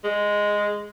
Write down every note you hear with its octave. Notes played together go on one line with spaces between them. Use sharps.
G#3